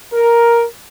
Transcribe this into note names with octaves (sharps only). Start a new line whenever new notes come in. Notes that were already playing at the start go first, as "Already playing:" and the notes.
A#4